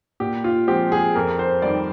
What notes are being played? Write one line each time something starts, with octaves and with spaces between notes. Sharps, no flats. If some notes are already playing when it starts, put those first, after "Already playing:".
A#2 G4
F4
F3 G#3 C4 G4
G#4
F2 A#4
C5
D#3 G3 D5